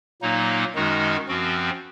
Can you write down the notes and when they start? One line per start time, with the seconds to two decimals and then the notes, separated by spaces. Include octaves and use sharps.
0.22 A#2 F#3 A#3 D#4
0.75 F#2 D#3 G#3 D#4 F#4
1.28 F#2 F3 C4 F#4